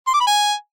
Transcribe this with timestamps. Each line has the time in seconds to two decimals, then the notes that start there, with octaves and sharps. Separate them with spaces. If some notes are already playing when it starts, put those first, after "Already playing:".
0.07 C6
0.14 D6
0.20 B5
0.27 G#5